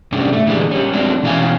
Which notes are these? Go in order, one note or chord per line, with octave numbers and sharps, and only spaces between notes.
G#2 C3 G3 C#4 D4
A3
A#2 D3 E3 G3 G#3
G3 C#4
F#3 G#3 C4 D4
B2 E3 C#4 G#4 F5 G#5